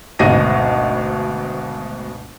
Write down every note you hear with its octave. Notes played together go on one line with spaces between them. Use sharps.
G#1 D2 B2 A#6 D#7